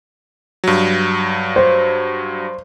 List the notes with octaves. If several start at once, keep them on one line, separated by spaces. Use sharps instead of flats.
G2 F#3
C5